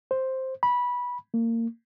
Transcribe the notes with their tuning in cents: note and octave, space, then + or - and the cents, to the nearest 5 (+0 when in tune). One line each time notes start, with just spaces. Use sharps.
C5 +5
B5 -15
A#3 -25